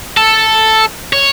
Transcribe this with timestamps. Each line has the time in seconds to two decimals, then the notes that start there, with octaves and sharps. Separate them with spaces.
0.17 A4
1.13 C#5